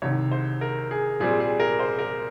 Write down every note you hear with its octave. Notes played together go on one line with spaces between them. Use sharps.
C2 C3 D#3 C#5
C5
A#4
G#4
A#2 G3 C4 G#4
G#4
A#4
C5
A#4